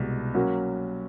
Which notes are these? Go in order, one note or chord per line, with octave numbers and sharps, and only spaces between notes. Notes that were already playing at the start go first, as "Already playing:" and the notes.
Already playing: C2 B2 G#3
F#3 A#3 C#4 F#4